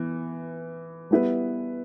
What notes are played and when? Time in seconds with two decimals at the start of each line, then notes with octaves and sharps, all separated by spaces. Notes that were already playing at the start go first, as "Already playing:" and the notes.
Already playing: E3 B3
1.11 G3 B3 E4 B4